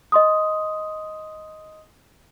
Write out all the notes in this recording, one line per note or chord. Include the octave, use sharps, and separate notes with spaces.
D#5 C6 D#6